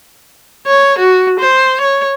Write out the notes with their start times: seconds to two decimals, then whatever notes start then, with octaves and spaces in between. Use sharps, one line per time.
0.66 C#5
0.99 F#4
1.40 C5
1.81 C#5